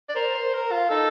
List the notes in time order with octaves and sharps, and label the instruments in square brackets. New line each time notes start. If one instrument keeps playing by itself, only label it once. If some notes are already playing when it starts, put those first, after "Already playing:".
[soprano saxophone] D5
[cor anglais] A#4 [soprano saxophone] C5
[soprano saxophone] C5
A#4
F4
[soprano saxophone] D#4 [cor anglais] A4